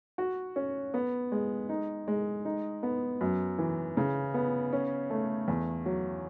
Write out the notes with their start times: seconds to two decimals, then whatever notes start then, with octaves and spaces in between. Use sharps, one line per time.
0.18 F#4
0.56 C#4
0.94 B3
1.32 G#3
1.69 D#4
2.08 G#3
2.45 D#4
2.83 B3
3.21 F#2
3.58 E3
3.97 C#3
4.34 B3
4.73 C#4
5.10 A3
5.48 E2
5.86 F#3